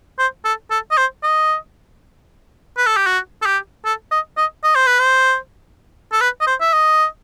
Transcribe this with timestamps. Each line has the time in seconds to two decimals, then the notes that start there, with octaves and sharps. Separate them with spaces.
0.18 C5
0.45 A4
0.70 A4
0.91 D#5
0.97 C5
1.23 D#5
2.77 B4
2.86 A4
2.96 G4
3.06 F#4
3.42 A4
3.45 G4
3.85 A4
4.11 D#5
4.37 D#5
4.63 D#5
4.75 C5
4.86 B4
4.99 C5
6.12 A4
6.21 B4
6.41 D#5
6.47 C5
6.61 E5
6.73 D#5